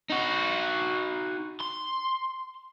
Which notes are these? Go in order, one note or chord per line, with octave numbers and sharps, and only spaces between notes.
D#4 F#4
C6